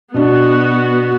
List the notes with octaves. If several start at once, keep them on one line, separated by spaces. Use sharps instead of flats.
B2 B3 D4 F#4